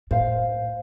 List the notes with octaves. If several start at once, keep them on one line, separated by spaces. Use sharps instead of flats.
A2 C5 F5